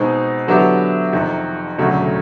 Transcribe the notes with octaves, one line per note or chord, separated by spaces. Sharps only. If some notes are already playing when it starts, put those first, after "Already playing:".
Already playing: B2 G#3 C4 D#4
D3 F#3 B3 E4 G4
F2 C3 D#3
E1 D2 C#3 F#3 A3